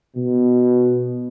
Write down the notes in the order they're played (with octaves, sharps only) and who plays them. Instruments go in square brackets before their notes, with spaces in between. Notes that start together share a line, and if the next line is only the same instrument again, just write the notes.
[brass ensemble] B2